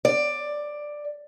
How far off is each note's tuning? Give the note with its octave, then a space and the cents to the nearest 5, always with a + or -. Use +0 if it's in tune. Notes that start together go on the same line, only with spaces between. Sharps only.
D5 +10